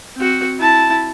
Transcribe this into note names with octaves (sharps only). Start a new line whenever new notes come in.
C4 F#4
E4 A5